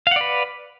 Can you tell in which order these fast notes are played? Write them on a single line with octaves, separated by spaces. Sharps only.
F5 F#5 D5 B4